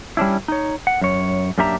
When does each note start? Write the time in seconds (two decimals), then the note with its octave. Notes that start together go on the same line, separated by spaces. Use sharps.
0.17 G3 C#4 D4 E4
0.48 D#4 C#5
0.87 F#5
1.01 F#2 C#5
1.58 F#2 A#3 D4 G4 E5 A#5